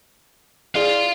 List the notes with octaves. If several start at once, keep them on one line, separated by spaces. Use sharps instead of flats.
E4 G#4 D5 F5 C6